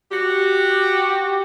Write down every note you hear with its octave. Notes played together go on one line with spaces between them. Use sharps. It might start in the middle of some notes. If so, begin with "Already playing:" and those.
F#4 G4